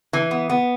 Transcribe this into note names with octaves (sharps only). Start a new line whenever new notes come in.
E3
B3
B3